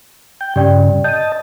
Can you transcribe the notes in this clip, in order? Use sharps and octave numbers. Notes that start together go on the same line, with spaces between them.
G5
G2 C#3 G4 D5 G5
D#5 A5 G6 D#7